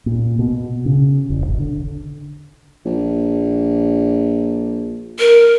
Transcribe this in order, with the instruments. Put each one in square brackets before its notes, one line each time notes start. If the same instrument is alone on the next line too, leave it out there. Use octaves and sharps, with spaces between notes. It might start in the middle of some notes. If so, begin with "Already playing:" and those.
[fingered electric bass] A#2
B2
C#3
E1
G#1
D3
[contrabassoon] A#1
[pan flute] A#4